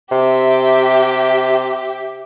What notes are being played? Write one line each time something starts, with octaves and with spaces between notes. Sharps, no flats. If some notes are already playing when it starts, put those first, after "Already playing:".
C3 G4 E5